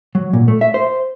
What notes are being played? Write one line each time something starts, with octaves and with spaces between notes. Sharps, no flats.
F#3
A#2
A3
E5
C5